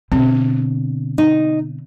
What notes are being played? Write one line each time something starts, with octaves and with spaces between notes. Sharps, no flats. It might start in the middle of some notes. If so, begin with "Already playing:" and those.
B2 D3 C4
D#4